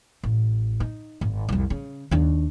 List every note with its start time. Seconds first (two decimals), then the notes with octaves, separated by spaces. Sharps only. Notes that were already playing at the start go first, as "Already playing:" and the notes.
0.23 A1
0.80 D#4
1.21 G#1
1.49 C2 F2
1.70 C#3
2.11 D#2 D4